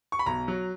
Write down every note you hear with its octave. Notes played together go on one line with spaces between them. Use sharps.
C#6
B5
B1 A#5
F#3